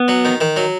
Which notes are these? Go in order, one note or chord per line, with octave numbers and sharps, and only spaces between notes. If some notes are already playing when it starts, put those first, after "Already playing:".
Already playing: B3
F#3
D#3
D#3
F#3